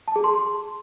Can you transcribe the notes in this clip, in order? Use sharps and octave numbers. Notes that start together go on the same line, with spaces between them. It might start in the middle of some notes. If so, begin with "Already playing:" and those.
A5
G#4
C6